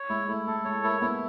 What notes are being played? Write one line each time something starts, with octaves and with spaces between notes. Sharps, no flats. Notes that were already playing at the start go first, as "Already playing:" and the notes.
Already playing: C#5
G#3 E4
A3 E4
A3 A4
G#3 C#5
A#3 E4
B3 E4